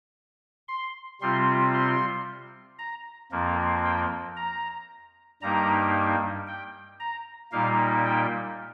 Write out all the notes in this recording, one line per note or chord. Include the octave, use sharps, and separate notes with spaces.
C6
C3 G3 C4 F4 C6
C6
A#5
F2 F3 A#3
G5
A#5
G2 G3 A#3 D#4 A#5
G5
A#5
A#2 G3 A#3 D#4 F5
G5